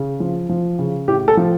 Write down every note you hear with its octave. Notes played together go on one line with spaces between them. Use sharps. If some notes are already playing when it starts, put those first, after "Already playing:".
Already playing: C#3
F3
F3
C#3
A2 G4
A4
F3